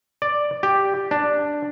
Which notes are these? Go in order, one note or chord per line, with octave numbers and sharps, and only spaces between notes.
D5
G4
D4